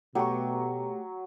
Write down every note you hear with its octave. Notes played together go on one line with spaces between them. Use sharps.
B2 F#3 A3 G4 C#6